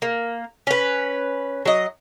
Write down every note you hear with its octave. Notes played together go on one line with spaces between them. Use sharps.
A#3
C#4 B4
F#3 D#5